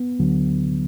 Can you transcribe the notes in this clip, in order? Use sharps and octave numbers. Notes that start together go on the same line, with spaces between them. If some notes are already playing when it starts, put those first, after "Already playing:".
Already playing: B3
D2 D3 F#3